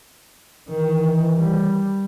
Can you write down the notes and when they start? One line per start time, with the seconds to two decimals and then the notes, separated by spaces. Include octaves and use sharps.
0.69 D#3 E3
1.37 G3